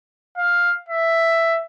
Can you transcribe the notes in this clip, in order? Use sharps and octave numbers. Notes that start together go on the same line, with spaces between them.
F5
E5